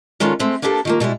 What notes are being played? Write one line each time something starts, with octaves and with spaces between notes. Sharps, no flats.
D#3 G#3 C#4 D4 F4 A4
G#3 A3 C4
A#3 B3 D4 G4 A4
D#3 F3 A#3
B2 G3 G#3 E4